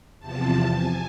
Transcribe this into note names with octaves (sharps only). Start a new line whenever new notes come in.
E2 C3 F3 A5
G#5